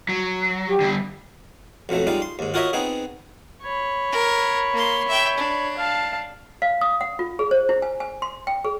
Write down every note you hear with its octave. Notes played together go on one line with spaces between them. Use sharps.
F#3
G4
D3 G3
B1 F2 F#3 A3
G3 G#3 D#4 F4
C6
D#2 G#2
F4 F#4 A#4 C#5 D#5 E5
B3 C4 D#4 G#4
C#5 B5
A#4
A#3 C6
E5 G5
D4
F5 A5
F5
D#6
F#5
F4
G#4
C5
E4
G#5
G#5
C6
G5
G#4